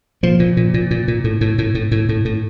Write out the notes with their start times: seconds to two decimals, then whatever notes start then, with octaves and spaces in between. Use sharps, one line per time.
0.23 A#2 F3
0.39 A#2
0.57 A#2
0.74 A#2
0.91 A#2
1.08 A#2
1.24 A2
1.41 A2
1.58 A2
1.75 A2
1.91 A2
2.09 A2
2.25 A2